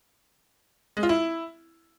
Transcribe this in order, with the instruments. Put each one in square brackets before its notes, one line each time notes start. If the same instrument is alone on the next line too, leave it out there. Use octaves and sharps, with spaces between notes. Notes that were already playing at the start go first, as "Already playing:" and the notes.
[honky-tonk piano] G#3
F4
E4